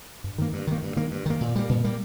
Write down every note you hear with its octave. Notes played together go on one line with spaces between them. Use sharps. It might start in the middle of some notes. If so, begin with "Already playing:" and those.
G2
D#3 A#3
G2
D#3 A#3
G2
D#3 A#3
G2
D#3 A#3
A#2
G3 A#3
A#2
G3 A#3